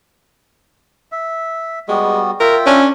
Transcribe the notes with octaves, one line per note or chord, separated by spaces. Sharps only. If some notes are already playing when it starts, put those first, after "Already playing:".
E5
G3 G#3 B3 F#4
F4 A#4 E5 G5
C#4 D4